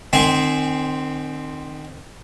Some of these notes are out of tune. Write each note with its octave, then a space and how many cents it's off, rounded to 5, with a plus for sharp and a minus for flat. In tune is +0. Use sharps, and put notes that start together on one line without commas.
D#3 -35 C4 +0 G#5 +0